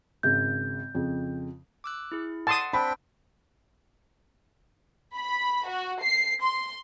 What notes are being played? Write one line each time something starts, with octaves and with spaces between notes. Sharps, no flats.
G#1 C#3 G6
F2 C#3
D6 E6 F#6
E4 G#4
F#5 A5 C6 D#6
C4 D4 G5 B5
B5
F#4
C7
C6